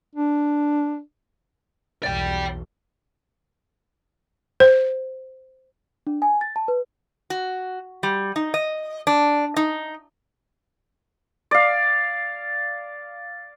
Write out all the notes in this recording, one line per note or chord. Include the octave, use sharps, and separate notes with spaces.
D4
B1 E2 D5 G5
C5
D4
G#5
A6
A5
B4
F#4
G3
D#4
D#5
D4
D#4
D5 F5